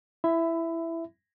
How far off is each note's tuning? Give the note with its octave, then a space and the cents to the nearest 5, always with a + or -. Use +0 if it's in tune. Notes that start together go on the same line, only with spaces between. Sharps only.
E4 +10 E5 +5 B5 +25